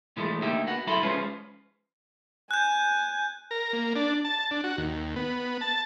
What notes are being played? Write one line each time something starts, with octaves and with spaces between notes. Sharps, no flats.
A#2 E3 F3 G#3 A3
D2 A#3 D#4 G4 E5
B3 F#4 F#5
F#3 E4 A4 E5 B5 C6
F3 G#3 C#4 F4 B4 C5
G#5 F#6 G6
A#4
A#3
D4
A5
D4
F#4
D#2
B3
A5